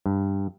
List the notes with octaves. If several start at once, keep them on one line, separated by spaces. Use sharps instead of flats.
G2